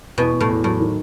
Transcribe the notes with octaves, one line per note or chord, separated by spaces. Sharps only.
E2 B2
E2
A2
E2
A2 F#3
D#3